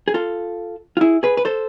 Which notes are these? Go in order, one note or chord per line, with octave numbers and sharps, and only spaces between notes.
G#4
F4 A4
F4
E4 G#4
G#4 B4
B4
A4 C5